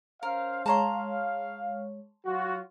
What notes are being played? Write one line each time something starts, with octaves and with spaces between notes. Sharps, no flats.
C#4 A#4 C5 F5
G#3 C#5 F5 A5 A#5 C6
F#3 F4 F#4